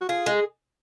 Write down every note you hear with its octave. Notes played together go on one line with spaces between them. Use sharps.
F#4
F4 G#4
G#3